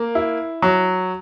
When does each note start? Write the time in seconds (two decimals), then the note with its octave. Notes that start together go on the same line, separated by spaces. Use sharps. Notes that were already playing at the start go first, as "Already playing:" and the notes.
Already playing: A#3
0.15 E4
0.62 F#3